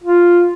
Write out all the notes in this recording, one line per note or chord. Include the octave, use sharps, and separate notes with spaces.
F4